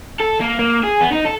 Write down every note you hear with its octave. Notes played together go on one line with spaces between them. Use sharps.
A4
A#3
A#3
G#4
B3
D#4
A4